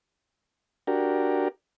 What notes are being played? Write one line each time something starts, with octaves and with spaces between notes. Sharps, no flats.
D4 F#4 G4 A#4